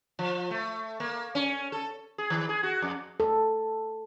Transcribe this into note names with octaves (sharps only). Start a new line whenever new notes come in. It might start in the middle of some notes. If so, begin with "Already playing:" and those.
F3
A3
A#3
C#4
A4
G#4
D#3
G#4
F#4
F2
A4